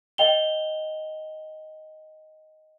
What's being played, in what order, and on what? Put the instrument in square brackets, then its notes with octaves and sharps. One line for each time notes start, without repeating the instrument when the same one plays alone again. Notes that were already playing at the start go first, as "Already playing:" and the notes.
[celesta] D#5 G5 F7 G7